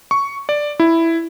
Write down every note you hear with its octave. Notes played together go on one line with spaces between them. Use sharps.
C#6
D5
E4